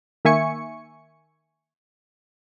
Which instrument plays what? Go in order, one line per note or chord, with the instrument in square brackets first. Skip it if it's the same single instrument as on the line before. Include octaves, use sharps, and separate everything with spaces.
[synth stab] D#3 A#3 E5 G#5 C#6 C#7